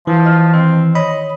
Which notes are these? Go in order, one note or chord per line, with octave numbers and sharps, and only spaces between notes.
E3 F3
D#5 F6
D#3 C4
C#5 D#5 B5